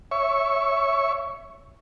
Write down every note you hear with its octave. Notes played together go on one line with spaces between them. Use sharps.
C#5 E5 C#6